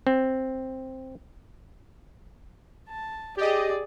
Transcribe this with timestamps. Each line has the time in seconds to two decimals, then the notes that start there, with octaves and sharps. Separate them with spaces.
0.07 C4
2.89 A5
3.37 G4 G#4 D5 D#5